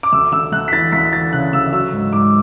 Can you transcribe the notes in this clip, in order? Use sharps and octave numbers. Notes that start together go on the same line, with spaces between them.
D6
D2 E6
D2 E6
D2 F#6
B6
E3 A6
D2 B6
E3 A6
C#3 F#6
D2 E6
F#3 E6
G#2
G#2 D6